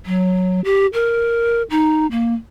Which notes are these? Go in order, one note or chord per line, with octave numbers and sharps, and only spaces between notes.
F#3
G4
A#4
D#4
A#3